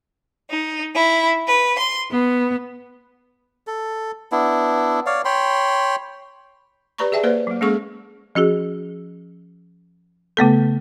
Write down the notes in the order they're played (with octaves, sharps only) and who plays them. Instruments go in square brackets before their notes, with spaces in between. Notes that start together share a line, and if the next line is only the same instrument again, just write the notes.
[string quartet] D#4
E4
B4
C6
B3
[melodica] A4
B3 D4 E4
C#5 D5 F5
C#5 G5 B5 C6
[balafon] G4 B4 D5 A#5 B5 C#6
G#4 D5 E5 G5 A5
A#3 B4 C5 D5
F#3 A#3
G#3 A#3 C#4 G#4 A4 C#6
[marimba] F3 C#4 F#4 G#4
C#3 A3 B3 A4